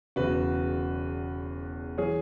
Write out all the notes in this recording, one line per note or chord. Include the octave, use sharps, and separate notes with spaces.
E1 E2 C#3 F#3 F#4 B4
E3 G#4 C#5